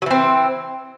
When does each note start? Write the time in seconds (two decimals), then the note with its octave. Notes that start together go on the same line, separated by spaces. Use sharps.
0.02 F#3
0.06 E3
0.11 C4